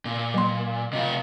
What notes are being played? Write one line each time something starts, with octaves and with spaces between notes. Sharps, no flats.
A#2
F#3 A#3 C6
C3 F4 D#5